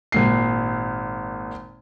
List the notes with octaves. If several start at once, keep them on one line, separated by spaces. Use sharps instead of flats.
G#1 A#2 C7